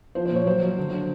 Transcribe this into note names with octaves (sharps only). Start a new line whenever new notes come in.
F3 C5
C5
A#2 C#5
F#3 C5
F#3
D3
D3